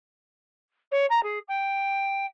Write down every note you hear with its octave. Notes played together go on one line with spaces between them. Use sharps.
C#5
A#5
G#4
G5